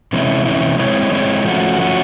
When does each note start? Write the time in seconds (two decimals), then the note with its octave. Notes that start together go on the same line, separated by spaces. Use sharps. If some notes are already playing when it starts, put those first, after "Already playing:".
0.13 C3 E3 G#3 C#4 E4
0.45 C3 E3 G#3 C#4 E4
0.79 G#3 C4 E4 G#4 C#5
1.12 G#3 C4 E4 G#4 C#5
1.45 F3 A3 C#4 F#4
1.78 F3 A3 C#4 F#4